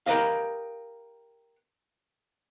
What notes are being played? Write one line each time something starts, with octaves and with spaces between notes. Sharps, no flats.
G4 A#4 B4 D#5 F5